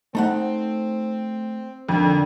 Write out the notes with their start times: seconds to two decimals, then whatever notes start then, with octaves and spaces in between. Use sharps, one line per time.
0.15 A3 C4 D#4 F#5
1.89 F2 D3 D#3